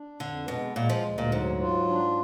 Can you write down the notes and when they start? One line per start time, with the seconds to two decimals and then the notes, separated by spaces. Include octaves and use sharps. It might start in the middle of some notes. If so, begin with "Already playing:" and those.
Already playing: D4
0.20 F2 D3
0.48 B2 G#3
0.75 A#2 G#3
0.89 F3
1.04 D2
1.18 A#2
1.31 G#2 F#3
1.60 F4
1.88 D4